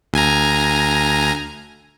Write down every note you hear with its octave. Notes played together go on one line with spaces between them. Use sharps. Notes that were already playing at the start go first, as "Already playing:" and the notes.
D2 G#5 A#5